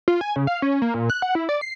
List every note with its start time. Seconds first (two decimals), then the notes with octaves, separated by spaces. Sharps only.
0.08 F4
0.21 G#5
0.36 C#3
0.47 F5
0.62 C#4
0.82 A#3
0.94 A#2
1.10 F#6
1.22 F#5
1.35 E4
1.49 D5
1.61 C7